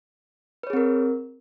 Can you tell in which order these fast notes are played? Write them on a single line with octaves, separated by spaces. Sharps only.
B4 C#5 G#4 C4 A#4